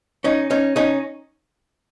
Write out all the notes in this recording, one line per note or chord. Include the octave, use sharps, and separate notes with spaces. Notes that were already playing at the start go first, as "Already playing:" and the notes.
C#4 D#4
C#4 D#4
C#4 D#4